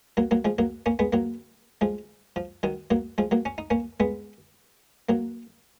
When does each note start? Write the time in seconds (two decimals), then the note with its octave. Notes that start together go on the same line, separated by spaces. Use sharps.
0.17 F#3 A#3
0.31 F#3 A#3
0.45 F3 G#3
0.58 F#3 A#3
0.86 A#3 C#4
0.99 G#3 B3
1.13 F#3 A#3
1.81 F3 G#3
2.36 F3
2.63 D#3 F#3
2.91 F#3 A#3
3.18 F3 G#3
3.31 F#3 A#3
3.45 C#4
3.58 D#4
3.70 A#3 C#4
4.00 G#3 B3
5.09 F#3 A#3